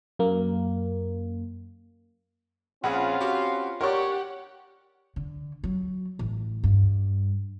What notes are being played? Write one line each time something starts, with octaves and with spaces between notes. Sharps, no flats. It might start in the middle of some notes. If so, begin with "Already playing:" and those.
F#2 A#3
A#1 C4 C#4 F4 G#4 F#5 B5 F6
F#4 G4
G4 A#4 C#5 D5 F#5 C#6
D3
F#3
A1
G2